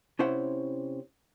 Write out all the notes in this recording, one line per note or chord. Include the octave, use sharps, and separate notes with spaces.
C3 C#4 E4 C5 C#5 F#5